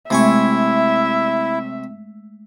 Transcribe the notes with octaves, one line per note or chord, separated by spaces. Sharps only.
C3 G#3 A3 E4 E5 G#5 C#6